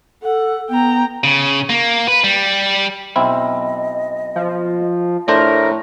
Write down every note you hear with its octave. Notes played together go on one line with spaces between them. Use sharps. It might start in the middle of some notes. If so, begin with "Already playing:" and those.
A4 F#5
B3 G5 A#5
C#3
A#3
B4
G3
B1 C4 E4 D#5
F3
A2 A3 D4 A#4 C5 A#6